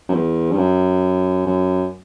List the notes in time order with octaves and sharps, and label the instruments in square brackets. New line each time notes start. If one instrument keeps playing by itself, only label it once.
[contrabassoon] F#2
E2
G2
F#2
F#2